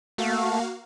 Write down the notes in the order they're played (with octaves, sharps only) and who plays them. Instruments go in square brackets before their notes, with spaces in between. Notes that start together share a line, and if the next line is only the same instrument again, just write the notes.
[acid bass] A3 [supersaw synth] A#3 F#4 F5